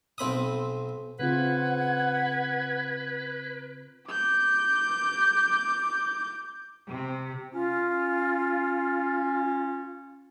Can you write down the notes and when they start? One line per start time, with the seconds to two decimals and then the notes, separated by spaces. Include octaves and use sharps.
0.18 B1 C4 B5 D#6
1.19 C#3 C4 F4 B4 F#5 G#6
4.08 D6 G6
6.88 C3
7.53 C#4 F4